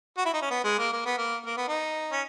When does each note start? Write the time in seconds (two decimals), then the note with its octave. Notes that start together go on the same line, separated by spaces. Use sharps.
0.18 F#4
0.25 E4
0.34 D#4
0.42 C#4
0.51 B3
0.64 G#3
0.79 A#3
0.92 A#3
1.05 B3
1.18 A#3
1.46 A#3
1.57 B3
1.68 D#4
2.12 C#4